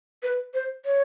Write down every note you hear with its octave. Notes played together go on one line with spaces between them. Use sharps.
B4
C5
C#5